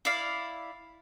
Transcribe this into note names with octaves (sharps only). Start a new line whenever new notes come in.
E4 D5 F5